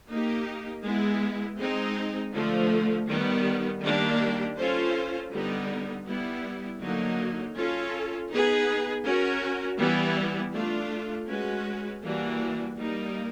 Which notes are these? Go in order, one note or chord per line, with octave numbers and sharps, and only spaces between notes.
A#3 D#4 G4
G#3 B3 E4
G#3 C4 D#4
D3 F3 A3
D#3 G3 B3
D#3 G3 A#3 D4 G4
C#4 F4 A4 C5
D3 G3 B3 D#4
G3 B3 E4
D3 F#3 A#3 D#4
C#4 F4 A4
B3 D#4 G#4 B4
C#4 F#4 A#4
E3 G3 B3 E4
A3 D4 F4
G#3 C#4 F#4 B4
E3 G3 A#3 D4 F#4
G3 A#3 D#4